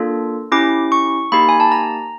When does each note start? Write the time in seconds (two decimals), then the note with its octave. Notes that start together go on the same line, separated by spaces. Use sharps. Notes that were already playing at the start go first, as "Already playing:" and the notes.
Already playing: A#3 D4 F4 A4
0.52 C#4 E4 G4 D6
0.92 C#6
1.32 A#3 D#4 G4 B5
1.49 G#5
1.60 A5
1.72 A#5